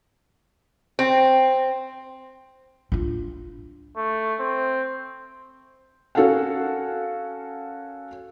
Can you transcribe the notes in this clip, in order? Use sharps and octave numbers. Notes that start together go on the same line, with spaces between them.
C4
D4 F4
A3
C4
C#4 F#4 A4 A#4 F5 F#5